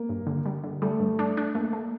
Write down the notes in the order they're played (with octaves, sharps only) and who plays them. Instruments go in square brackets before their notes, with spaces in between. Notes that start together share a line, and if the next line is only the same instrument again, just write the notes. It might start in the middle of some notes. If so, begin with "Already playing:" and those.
Already playing: [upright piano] A#3
[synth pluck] G2
D3
G3
D3
[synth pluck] G3 [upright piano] A3
[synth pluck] G2
D4
D4
[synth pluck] A3 [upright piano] A#3
[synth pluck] A3